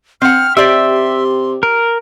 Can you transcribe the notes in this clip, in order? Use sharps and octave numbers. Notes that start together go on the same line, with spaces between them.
C4 F#5 F6
C3 G4 D5 E5 C6
A#4